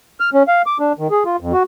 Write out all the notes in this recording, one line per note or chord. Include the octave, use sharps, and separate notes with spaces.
F6
C#4
F5
D6
D4
D#3
G#4
F4
F2
F#4